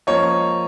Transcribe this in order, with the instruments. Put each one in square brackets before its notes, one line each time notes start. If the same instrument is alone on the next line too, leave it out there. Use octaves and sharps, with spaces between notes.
[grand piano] F3 A#3 C#4 C#5 D#5